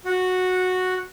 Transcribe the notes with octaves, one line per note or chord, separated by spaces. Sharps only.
F#4